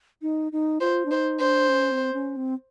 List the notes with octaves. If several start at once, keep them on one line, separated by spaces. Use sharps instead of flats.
D#4
D#4
F4 C5
D4
D#4 C5
D4 C5
C#4
C4
C#4
C4